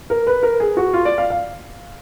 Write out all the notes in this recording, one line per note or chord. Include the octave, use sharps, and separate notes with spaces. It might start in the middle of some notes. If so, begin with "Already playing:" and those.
A#4
B4
A#4
G#4
F#4
F4
D5
F5
F5